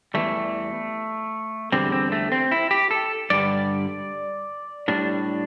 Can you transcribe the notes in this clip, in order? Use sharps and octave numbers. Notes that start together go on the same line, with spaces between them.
E2 E3 G3 A3
E2 D3 G3 C4
C4
A3
C4
E4
G4
A4
G2 D3 G3 D5
A2 G3 D4